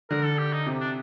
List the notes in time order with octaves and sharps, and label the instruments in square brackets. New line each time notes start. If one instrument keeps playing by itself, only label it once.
[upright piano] D3 [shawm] A#4
[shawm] A4
G4
D#4
[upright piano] C3
[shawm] D4